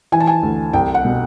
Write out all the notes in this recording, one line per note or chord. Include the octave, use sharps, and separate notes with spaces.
E3 G#5
A5
G#5
D2
C2 G5
F#5
B2